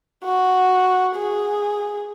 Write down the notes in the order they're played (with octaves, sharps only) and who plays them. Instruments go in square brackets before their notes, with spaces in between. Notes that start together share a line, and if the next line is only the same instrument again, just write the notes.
[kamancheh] F#4
G#4